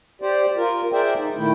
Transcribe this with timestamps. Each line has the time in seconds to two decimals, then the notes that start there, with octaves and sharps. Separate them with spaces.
0.22 G4 C5 D5
0.57 F4 A#4
0.93 G#4 A#4 C5 D5 E5 G5
1.17 D#4
1.36 A#2 D#3 A3 E4 G5